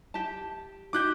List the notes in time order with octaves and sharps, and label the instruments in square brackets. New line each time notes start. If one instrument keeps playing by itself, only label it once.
[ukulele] G4 A5
[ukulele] D#4 F#4 G4 [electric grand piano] D6 F#6 G6